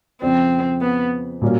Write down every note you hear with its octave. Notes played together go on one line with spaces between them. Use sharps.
F2 C#3 F3 C4
B3
A#2 G3 A#3 C#4 F#4